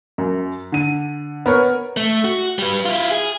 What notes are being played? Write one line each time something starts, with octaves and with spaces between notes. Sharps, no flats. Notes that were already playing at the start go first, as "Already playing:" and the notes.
F#2
D3 D#7
B3 A#4 C#5
A3
F#4
G3 B4
E4 F4
G#4